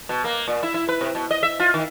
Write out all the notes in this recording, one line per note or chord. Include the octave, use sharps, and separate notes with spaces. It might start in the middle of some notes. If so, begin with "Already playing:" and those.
B2
A#3
A#2
E4
E4
B4
C3
B2
D#5
E5
F4
D#3